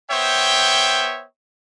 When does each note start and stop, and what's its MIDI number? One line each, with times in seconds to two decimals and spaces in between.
0.10 1.25 59
0.10 1.25 72
0.10 1.25 73
0.10 1.25 76
0.10 1.25 79